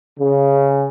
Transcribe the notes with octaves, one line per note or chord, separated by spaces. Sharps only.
C#3